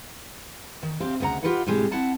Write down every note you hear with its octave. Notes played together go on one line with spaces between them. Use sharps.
D#3
D2 C4 G4 F5
D2 C#3 B4 F#5 A#5
F4 G4 A4 B4 D#5 F#5
A2 C3 G3 G#3 G4
C4 E4 F#5 A5